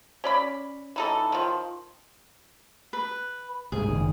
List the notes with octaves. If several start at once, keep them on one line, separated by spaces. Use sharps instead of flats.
C#4 D5 B5
E3 D#4 A4
D#3 F3
B4
C2 G#2 G#4
F#1 A2 D#3